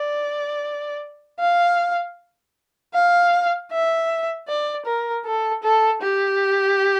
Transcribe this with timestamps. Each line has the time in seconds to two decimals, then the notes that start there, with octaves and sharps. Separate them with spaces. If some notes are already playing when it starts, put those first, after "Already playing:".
Already playing: D5
1.40 F5
2.94 F5
3.71 E5
4.48 D5
4.86 A#4
5.25 A4
5.63 A4
6.02 G4